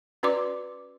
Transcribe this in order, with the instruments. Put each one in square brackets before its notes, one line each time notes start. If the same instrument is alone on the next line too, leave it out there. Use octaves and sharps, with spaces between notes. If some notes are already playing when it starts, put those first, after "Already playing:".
[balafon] C#4 F#4 B4 D5 C6 D6